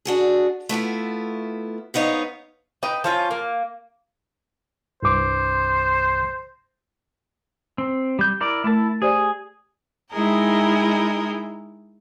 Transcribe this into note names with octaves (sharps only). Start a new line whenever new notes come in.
D4 F#4 G#4
A3 B3 E4 F4
G#2 B3 D#4 C#5 F5
D#4 B4 G5
F3 C#4 F4
A#3
C2 G2 C5 D6
C4
G3 G6
E4 A#4 D5
A3 E4 A#4 A5
G4 G#4 C5 D5
G#3 D#4 E4 G#4 A#4 G5